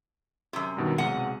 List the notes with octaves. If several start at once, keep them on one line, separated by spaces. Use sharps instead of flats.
F#2 C3
G2 B2 D#3
B1 C3 G#3 F#5 D#7